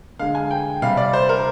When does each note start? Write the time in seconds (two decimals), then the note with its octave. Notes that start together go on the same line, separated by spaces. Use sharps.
0.19 D3 G#3 F5
0.35 G#5
0.51 G5
0.82 C3 G3 F5
0.97 D5
1.13 C5
1.29 A#4